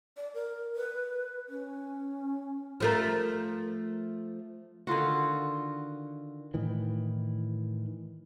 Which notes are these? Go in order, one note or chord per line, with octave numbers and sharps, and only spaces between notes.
D5
A#4
B4
C#4
F3 A3 A#4
D3 D#3 F4 F#4
A2 D#3 E3